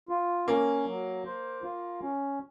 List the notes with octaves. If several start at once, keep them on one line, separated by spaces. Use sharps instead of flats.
F4
A#3 C#4
F#3
C5
F4
C#4